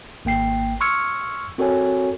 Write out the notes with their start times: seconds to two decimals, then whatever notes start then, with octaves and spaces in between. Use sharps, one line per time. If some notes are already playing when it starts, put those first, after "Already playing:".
0.25 G#1 A#3 G5 C7
0.81 C6 C#6 E6 F6 G#6 C#7
1.58 C4 F#4 A4 A#4 C#5 G#5